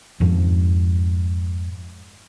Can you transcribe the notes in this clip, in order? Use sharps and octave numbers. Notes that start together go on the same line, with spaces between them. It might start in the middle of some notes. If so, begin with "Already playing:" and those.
F2 G#2 F3